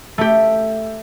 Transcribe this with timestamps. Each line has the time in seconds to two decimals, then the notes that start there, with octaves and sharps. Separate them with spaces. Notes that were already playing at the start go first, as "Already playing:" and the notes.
0.18 A3 G4